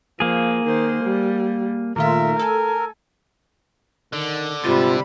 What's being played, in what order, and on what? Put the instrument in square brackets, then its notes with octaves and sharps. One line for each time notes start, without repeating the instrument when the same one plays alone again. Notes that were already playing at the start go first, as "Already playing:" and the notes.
[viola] F3 [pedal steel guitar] A#3 G#4
[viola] D#3 C5
G3
[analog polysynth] A#2 D#3 F4 [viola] A3 E5 [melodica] A#4
[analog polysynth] A4 [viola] G#5
[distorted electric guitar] D3 [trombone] D#3
[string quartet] G#2 G3 B5 [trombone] C3 [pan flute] F4